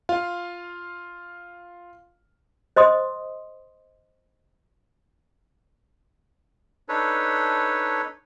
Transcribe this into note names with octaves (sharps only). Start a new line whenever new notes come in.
F4 F5
C5 D#5 C6 D#6
D4 D#4 A4 B4 C#5